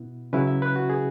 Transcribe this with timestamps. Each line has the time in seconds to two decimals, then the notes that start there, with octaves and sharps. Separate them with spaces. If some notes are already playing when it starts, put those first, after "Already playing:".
Already playing: B2 B3 E4
0.33 C#3 F#3 C#4 E4 B4
0.47 E5
0.62 B4
0.76 F#4
0.90 G#4